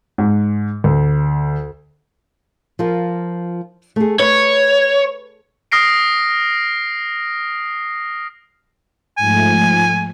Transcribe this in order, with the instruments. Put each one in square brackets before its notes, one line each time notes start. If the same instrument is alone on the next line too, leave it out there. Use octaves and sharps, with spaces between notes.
[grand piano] G#2
D2
[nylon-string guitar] F3 F4 A#4
A3 G#4
[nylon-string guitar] B4 [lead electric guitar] C#5
[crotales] D#6 F6 A#6 C7 D7
[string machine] G#2 F3 A3 [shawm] G#5